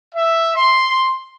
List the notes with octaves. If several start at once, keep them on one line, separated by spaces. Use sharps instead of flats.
E5
C6